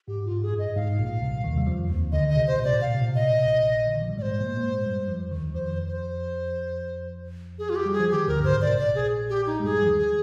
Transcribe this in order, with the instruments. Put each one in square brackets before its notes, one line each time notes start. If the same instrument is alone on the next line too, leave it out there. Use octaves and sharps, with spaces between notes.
[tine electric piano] G#2 [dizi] G4
[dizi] F4
[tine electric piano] G#2
[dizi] G#4
[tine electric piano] G2
[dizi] D#5
[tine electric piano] G#2 [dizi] F5
[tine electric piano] A#1 A#2
C2 C3
D#2 D#3
G3
F2 F3
D#2 D#3
[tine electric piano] D2 D3 [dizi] D#5
[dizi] D#5
[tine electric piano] C2 C3
[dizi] C5
[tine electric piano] A#2
[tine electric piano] C3 [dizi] D5
[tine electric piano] A#2
[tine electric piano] C3 [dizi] F5
[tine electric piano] A#2
C3
A#2
C3
[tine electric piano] A#2 [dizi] D#5
[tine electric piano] C3
A#2
C3
A#1 A#2
D3
D#3
F3
G3
[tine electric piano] G#2 G#3 [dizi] C5 D5
[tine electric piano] A#2 A#3
A#3
G#2 G#3
G2 G3
F2 F3
D#2 D#3
G3
[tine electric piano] F2 F3 [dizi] C5
[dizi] C5
G#4
F4
G4
[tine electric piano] G3
[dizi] G#4
[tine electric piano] F3
[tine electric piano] D#3 [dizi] G4
[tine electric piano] D2 D3 [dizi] A#4
[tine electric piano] G2
[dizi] C5
[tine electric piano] G#2
[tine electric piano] C3 [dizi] D5
[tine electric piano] A#1 A#2
[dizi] D5
G#4
G4
D#4
[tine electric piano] G#3
[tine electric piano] G2 G3 [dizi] G#4
[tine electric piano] F3
D#2 D#3
[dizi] G#4